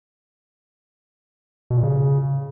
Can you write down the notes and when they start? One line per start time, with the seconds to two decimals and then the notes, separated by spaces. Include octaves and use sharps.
1.70 B2
1.77 A#2
1.83 C#3